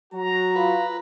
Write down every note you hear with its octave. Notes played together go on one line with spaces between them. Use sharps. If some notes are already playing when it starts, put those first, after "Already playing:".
F#3 F#4 A#5
F4 B4